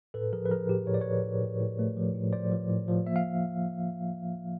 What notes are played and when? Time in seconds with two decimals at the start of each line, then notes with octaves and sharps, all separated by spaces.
0.14 A2 A4 B4
0.33 F3 G#4 A#4
0.46 B4
0.50 F3 G#4 A#4
0.69 A2 G4
0.87 A2 C#5
0.94 D5
1.01 A2 B4 C#5
1.24 A2
1.42 A2
1.61 A2
1.79 A3
1.97 F3
2.15 A2
2.33 F3 C5 D5
2.51 F3
2.70 A2
2.88 F3
3.07 A#3 E5
3.16 F5